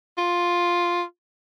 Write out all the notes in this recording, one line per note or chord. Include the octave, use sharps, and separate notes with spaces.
F4